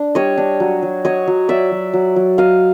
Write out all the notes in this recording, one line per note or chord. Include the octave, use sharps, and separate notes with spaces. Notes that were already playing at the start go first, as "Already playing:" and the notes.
Already playing: D4
G3 C#5 D#5
D4
F#3
F#3
F#3 C#5 D#5
F#3
F#3 D5 E5
F#3
F#3
F#3
F#3 D#5 F5